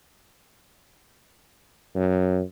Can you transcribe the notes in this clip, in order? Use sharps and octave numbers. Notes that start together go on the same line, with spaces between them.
F#2